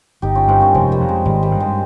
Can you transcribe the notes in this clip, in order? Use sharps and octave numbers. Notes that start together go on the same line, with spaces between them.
G1 D#4 G4
C#4 F4
G2 C4 D#4
A#3 C#4
F1 G#3 C4
G3 A#3
F2
G#3
G#1 G3
G3 A#3
G2
G#3 C4